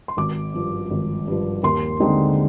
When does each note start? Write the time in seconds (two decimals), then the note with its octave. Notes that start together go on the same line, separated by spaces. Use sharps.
0.08 C6
0.17 G#1 D6
0.54 G2 F3
0.91 G#1
1.27 G2 F3
1.63 D#2 C6
2.00 D3 G#3 C4 D#4